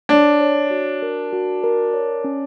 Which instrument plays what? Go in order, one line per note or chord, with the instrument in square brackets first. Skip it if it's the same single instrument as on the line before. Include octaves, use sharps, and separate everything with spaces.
[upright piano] D4 [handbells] C#5
[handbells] C#5
F#4
A#4
F#4
A#4
C#5
C#4